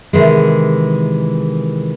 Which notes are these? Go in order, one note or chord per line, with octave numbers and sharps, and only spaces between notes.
C3 D#3 E3 G#3